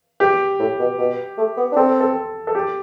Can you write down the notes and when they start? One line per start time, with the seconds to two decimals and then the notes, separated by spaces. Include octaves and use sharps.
0.20 G4
0.59 A2
0.79 B2
0.98 B2
1.38 A3
1.57 B3
1.72 D4
1.77 C4 A4
2.00 A4
2.47 A4
2.55 G4